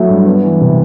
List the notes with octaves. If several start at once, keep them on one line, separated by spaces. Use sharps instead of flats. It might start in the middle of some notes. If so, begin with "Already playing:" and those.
Already playing: F#3 A3 E4
G2
B3
E3
C3